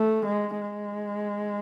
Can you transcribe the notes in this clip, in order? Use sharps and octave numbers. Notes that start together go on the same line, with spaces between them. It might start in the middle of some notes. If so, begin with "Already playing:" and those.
Already playing: A3
G#3
G#3